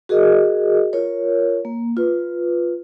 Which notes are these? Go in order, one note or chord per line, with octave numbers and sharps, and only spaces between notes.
F#4 G#4 A#4 D#5
F4 A#4 C#5
A#3
F4 B4